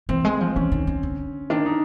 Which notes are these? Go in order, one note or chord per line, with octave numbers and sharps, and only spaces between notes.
E3 C4
G#3
F3
E3 C#4
D#3
D#3
D3
D#3 D4
D#4